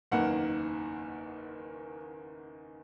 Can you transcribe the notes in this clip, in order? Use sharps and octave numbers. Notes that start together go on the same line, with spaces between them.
F#1 E2 D#3 A#3 F#5